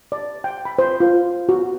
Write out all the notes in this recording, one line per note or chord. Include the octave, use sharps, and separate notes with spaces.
D5
G5
B5
C5
F4
F#4